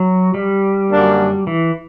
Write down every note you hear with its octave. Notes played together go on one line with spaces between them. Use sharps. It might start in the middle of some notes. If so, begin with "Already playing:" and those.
Already playing: F#3
G3
F#2 D3 A#3 D4
E3